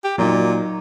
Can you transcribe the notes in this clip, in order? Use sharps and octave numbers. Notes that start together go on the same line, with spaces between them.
G4
A#2 F#3 D#4